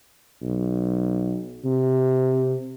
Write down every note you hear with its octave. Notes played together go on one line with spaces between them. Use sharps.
B1
C3